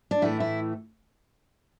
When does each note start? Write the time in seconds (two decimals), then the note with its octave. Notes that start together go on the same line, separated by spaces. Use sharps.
0.11 D4
0.22 A2 E3 A3 E4
0.40 E4